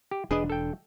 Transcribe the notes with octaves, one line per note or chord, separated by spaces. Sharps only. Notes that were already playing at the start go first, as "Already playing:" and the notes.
G4
E1 D4 G#4 B4 D#5
A4 G5